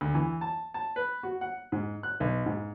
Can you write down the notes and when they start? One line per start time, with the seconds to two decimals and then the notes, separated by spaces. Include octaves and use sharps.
0.01 D2
0.15 E3
0.41 A5
0.74 A5
0.96 B4
1.23 F#4
1.41 F#5
1.72 G#2
2.03 F#6
2.20 B1
2.46 G#2